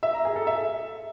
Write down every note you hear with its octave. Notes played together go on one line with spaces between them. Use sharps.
E5
A#5
G#4
A4
E5